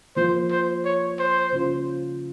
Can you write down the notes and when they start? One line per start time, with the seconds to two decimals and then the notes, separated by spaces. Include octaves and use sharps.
0.16 F3 A#3 F4 C5
0.51 C5
0.85 C#5
1.19 C5
1.53 C#3 G3 C#4 F4